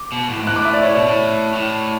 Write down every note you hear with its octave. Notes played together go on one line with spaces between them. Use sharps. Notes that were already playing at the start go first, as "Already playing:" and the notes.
Already playing: D6
B2
A2
G#2
A2 F#6
D6
E5
D5
A2 C#5
B2
A2
A2